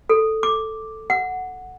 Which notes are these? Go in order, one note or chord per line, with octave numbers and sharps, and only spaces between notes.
A4
D6
F#5